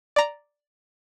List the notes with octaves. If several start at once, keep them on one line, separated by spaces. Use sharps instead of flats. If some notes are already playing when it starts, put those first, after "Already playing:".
D5 A#5